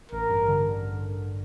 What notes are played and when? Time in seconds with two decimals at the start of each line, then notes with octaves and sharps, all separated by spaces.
0.11 A1 A#4
0.29 G2
0.48 D3